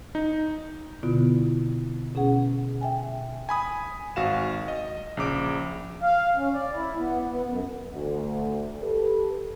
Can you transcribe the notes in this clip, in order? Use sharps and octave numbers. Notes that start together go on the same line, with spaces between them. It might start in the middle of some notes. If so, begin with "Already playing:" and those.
D#4
B2 D3 B3 E4 F4
B2 C#4 G#4 F#5
E5 G5 G#5
G#5 B5 D#6
G#1 F#4 F5 E7
D#5
A#1 C#3 D6 D7
F5
C#4
D5
E4
B3
B3
F#2
D2
G4 A4 B4